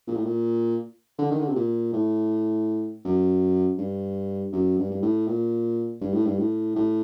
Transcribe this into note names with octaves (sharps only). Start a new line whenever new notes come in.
A#2
A2
A#2
D3
D#3
D3
C3
A#2
A2
F#2
G2
F#2
G2
G2
A2
A#2
G2
A2
G2
A2
A2